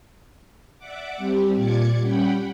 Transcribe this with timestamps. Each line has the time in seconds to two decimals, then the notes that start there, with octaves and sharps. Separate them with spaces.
0.78 D5 E5 F#5 D6
1.17 G3 C4 G4
1.54 A#2 F4 D5 D6 G#6 C#7
2.00 G3 C#4 F#5 G5 B5